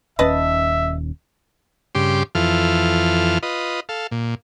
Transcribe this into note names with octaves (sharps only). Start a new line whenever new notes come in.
D#1 D#2 C#4 B4 D#5 E5 A5
G2 C#3 G4 C6 D6
F2 E3 F4 A4 F6
F4 B4 D#5
A4 F5
A#2